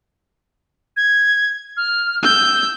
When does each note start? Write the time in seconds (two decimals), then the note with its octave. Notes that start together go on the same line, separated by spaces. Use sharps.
0.97 G#6
1.77 F6
2.23 E6 G6